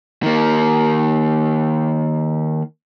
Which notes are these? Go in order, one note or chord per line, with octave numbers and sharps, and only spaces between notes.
D#3 A#3